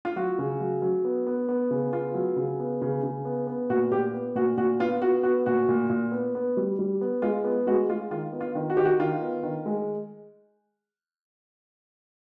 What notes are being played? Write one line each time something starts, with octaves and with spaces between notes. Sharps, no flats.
F4
F#3 F#4
C#3
F#3
F#3
B3
B3
B3
C#3
B3 F4
F#3
C#3
B3
C#3
C#3
B3
B3
A#2 F#4
A#2 G4
B3
A#2 F#4
A#2 F#4
B3 F4
B3 F#4
B3 F#4
A#2 F#4
A#2
A#2
B3
B3
G3
G3
B3
G#3 F4
B3
G#3 F#4
G#3 F4
D#3 F4
B3
F4
D#3
F#4
D#3 G4
F#4
D#3 F4
B3
D#3
G#3